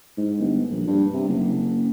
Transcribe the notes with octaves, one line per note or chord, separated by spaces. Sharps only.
G#2
G1
A#1
G2
C3
F#1